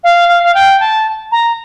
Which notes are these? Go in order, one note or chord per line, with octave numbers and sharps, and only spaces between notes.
F5
F5
F5
G5
A5
A#5